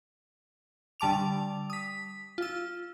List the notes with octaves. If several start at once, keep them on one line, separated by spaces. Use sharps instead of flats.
D3 G3 A5 D6 F7
D#6 B6
F4 E6